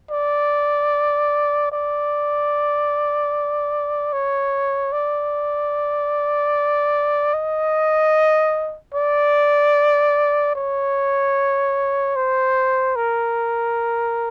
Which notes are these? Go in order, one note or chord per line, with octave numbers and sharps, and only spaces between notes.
D5
D5
C#5
D5
D#5
D5
C#5
C5
A#4